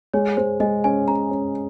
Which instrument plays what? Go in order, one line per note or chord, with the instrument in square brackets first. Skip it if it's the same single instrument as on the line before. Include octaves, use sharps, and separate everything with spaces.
[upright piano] G#3 [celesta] C#5
[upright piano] G#3 [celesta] C5
[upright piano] G#3 [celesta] D#5
[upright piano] C#4 [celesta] G#5
[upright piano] C#4 [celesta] A#5
[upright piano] C#4